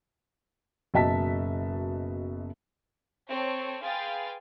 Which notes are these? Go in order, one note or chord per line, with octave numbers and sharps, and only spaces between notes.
F#1 B2 D#5 E5 A5 B6
C4 A4 C#5
G#4 B4 F5 G5 C6 A6